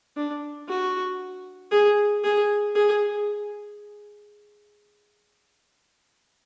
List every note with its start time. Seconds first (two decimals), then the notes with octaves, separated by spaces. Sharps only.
0.16 D4
0.68 F#4
1.71 G#4
2.24 G#4
2.75 G#4